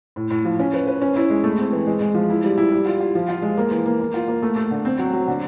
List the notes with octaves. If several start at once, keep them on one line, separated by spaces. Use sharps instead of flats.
A2
A2
F3
C#4
B4
B4
C#4
E4
G#3
A3
C4
E3
G#3
G#3
F3
E4
G3
E4
G3
F4
F4
F3
F4
G#3
A#3
E3
A#3
A#3
F4
A#3
A3
A3
D3
C4
F#3
F#3
D3